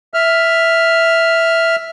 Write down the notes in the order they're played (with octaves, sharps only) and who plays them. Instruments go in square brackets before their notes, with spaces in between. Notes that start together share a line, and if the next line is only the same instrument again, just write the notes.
[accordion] E5 F6